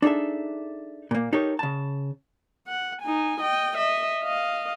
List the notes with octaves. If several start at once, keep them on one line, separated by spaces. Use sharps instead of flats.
D4 D#4 G#4 A4 E5
A#2 A#3
D#4 G4 A4 A#4 C#5
C#3 A5
F#5
D#4 G#5
D#5 G5
D#5 E5
D#5 F5